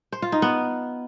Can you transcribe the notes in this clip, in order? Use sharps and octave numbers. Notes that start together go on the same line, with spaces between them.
C5
F4
D#4
B3